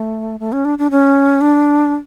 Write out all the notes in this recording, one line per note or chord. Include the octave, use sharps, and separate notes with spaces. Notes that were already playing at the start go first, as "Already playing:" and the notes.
Already playing: A3
A3
C#4
D4
D4
C#4
D4